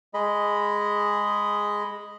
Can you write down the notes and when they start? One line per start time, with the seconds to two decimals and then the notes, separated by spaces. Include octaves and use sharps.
0.14 G#3 G#4 D#5 B5